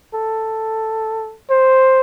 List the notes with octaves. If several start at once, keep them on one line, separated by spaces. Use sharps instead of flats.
A4
C5